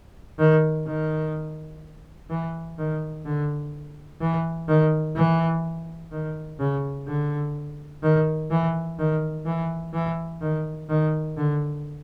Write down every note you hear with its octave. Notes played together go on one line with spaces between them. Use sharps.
D#3
D#3
E3
D#3
D3
E3
D#3
E3
D#3
C#3
D3
D#3
E3
D#3
E3
E3
D#3
D#3
D3